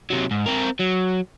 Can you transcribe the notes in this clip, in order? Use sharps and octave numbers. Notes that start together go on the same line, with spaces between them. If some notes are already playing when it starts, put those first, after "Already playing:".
C3 F#3
G#2
C4 A#4
F#3